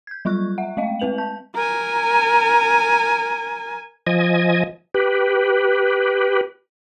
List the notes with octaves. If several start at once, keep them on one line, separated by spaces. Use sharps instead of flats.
G6 G#6
F#3 G3 F4 C#6 F#6
E5 F#5
G#3 A3 D#5 F5 G5
G#3 C4 B4 F7 F#7
A5 G6
A#4 G#5
F3 D#5 G#5
G4 B4